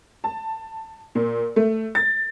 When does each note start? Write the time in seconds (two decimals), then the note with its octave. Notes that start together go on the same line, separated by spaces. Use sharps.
0.24 A5
1.15 A#2
1.56 A3
1.95 A6